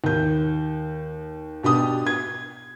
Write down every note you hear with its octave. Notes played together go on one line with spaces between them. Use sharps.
D#2 G6
B2 D4 G4 D#6
G#6